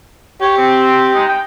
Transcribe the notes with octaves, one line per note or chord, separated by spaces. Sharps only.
G4 C#5
C4
G#3 D#4
G5